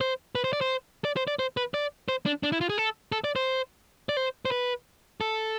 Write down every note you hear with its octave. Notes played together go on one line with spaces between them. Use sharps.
C5
B4
C5
D5
C5
D5
C5
D5
C5
B4
D5
C5
D4
D4
E4
F4
G#4
A4
A4
D5
C5
D5
C5
C5
B4
A4